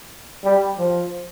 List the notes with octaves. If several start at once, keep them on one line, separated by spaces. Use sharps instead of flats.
G3
F3